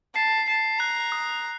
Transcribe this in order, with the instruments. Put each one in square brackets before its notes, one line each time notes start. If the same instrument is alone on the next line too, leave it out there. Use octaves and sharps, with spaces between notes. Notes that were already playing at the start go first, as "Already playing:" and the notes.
[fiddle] A5 [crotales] C7
[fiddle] A5 [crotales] C7
[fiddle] A#5 [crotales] F#6
[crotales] D#6